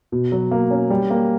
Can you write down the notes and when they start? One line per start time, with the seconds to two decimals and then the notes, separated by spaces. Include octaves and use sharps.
0.12 B2
0.32 F#3
0.51 A#3
0.71 C#4
0.90 G3
1.10 A#3